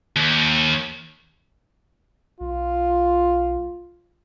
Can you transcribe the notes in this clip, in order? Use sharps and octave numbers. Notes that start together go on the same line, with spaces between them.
D#2
B1 F4